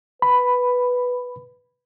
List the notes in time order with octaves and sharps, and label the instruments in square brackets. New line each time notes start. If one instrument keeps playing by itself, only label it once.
[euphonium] B4 [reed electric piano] B5